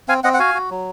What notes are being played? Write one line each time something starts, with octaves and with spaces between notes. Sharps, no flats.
C4 F5 G#5
C4 D#5 F#5
F#5
F#4 F5 G#5
F#4
F#3